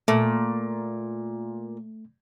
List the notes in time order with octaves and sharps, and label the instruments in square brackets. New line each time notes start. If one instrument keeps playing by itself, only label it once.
[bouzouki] A#2 [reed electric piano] A3